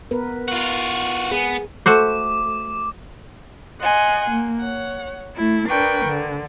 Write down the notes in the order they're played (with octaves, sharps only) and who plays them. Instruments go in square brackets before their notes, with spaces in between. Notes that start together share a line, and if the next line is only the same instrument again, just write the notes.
[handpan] B3 A#4 B4
[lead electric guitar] F4 F#4
[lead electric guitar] B3 [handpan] G#4
[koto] A3 F#4 C5 [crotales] D6
[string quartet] D#5 F#5 G#5 C6
A#3
C#5 F#5
A3 E4
D4 A#4 B4 G5 C#6
D3